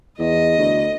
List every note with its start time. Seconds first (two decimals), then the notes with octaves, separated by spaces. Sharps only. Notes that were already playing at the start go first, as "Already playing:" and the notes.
0.19 E2 D#5
0.58 D2